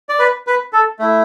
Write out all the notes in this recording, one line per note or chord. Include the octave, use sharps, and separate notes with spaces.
D5
B4
B4
A4
A3 E4